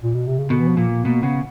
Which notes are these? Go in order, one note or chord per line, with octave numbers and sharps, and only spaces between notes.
A#2
B2
C3
C#3
B2 D3
E3
F3
A#2
B2 A#3
C#3 B3